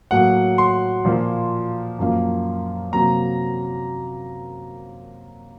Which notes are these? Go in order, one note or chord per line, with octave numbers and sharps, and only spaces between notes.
A2 F#3 A#3 F#5
C6
A#2 F3 A#3
F#2 F3 A#3
C3 F#3 A#3 A#5